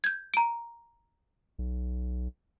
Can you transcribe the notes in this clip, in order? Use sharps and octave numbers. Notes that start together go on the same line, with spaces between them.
G6 G#6
A#5 D7
B1